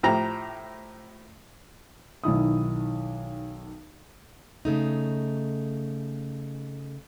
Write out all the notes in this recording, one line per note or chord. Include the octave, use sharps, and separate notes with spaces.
A2 F3 G4 A#5
B1 D#3 E4 D#6
C#3 A3 D#4